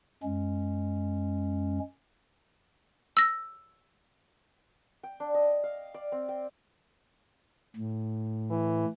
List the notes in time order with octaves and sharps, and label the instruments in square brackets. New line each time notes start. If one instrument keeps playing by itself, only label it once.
[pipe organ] F#2 G#3 C#4
[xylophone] E6 A#6
[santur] G5
D4
D#5
F5
D5
C4
G5
[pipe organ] A2
[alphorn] E3